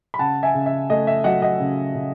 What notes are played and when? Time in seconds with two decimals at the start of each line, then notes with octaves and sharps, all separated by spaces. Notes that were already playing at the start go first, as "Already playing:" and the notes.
0.14 B5
0.19 C#3 F#5 A5
0.43 E5 G#5
0.54 C#3
0.66 E5
0.90 A3 D#5
1.07 E5
1.24 F#3 D#5 F#5
1.42 D#5 F#5
1.60 C#3
1.95 C#3